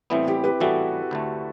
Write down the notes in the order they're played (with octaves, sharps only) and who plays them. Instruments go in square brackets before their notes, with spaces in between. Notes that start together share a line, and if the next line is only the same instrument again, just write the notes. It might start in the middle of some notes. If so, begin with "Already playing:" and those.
[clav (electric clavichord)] A2 E3 G3 B3 [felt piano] C4 E4
[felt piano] E4 G4
G4 B4
[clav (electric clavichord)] A2 E3 G3 B3 [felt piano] F#4 A4
[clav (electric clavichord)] D2 D3 A3